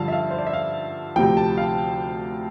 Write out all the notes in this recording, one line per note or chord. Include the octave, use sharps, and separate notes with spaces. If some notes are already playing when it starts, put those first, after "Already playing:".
Already playing: G2 D3 F3 F5 A5
E5
F5
C5
D5
E5
F5
D2 C3 F3 G5
A5
F5